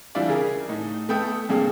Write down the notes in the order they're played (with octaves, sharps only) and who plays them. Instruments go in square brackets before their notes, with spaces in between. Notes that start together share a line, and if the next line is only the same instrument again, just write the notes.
[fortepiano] E3 G3 D4 E4 F4 D5
C#3 G#4 A#4
A2 D#4
A3 B3 G5 A5 D#6
G2 C3 G#3 A#3 D4